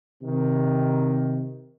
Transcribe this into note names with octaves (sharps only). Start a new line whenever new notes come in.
C3 D#3